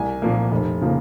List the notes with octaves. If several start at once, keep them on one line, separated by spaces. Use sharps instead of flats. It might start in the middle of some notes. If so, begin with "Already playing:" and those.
Already playing: C2 G#5
A#2 F3 A#3
F1
C#3 F3 A#3